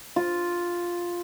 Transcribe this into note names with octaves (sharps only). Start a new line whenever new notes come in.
F4